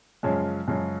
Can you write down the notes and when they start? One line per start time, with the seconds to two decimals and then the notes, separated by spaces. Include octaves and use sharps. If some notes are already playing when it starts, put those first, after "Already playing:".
0.23 F#2 C#3 F3 G#3 C#4
0.68 F#2 C#3 F3 G#3 C#4